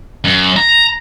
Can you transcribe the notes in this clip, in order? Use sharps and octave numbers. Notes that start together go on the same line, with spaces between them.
F#2
A#5